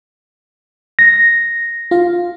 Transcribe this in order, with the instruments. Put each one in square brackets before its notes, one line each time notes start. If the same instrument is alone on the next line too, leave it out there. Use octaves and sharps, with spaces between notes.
[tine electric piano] A#6
[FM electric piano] F4 F5